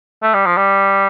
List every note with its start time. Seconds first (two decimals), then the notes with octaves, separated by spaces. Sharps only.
0.23 A3
0.34 G3
0.46 F3
0.57 G3